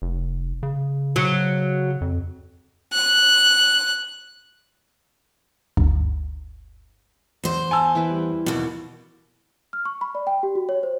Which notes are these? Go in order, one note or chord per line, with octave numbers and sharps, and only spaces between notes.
F1
C#3
F#3
F2
F#6
G1 D2 G2
E2 C5
G#5 A5 E6
E3 E4 B4
G3
D#2 B2 D5
F6
C#6
B5
D5
G5
G4
F#4
C#5
C5